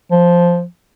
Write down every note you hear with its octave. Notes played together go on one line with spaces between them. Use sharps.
F3